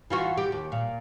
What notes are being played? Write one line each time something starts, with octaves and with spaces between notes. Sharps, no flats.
E3 F4 F#4
G4
D#2
A#2